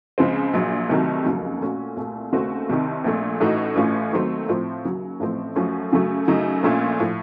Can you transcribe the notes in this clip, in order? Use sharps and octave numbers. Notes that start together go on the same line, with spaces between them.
C#2 C#3 F3 C4
A#1 A#2 F#3
C2 C3 D#3 F#3 A3
F1 D#2 C#3 F#3
A#2 A3 C#4 F#4
C2 A#2 A3
D#2 C#3 A3 C4 F#4
C2 C3 D#3
A#1 A#2 A3
A1 A2 A3 D#4 F#4
A1 A2 A3 C#4 F4
D#2 D#3 F#3 A3 C4
A2 F3 C4 F4
D#2 C#3 F#3
A1 A2 F3 A3 C4
F#2 F3 A3 C#4 F#4
F#2 C#3 F#3 A3
F#2 C#3 F#3 A3 D#4
A#1 A#2 A3 C#4 F4
A2 F3 A3